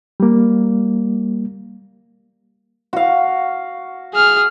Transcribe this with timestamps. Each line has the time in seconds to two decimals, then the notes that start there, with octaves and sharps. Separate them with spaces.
0.20 G3 A#3
2.93 F#4 F5
4.14 G#4 F6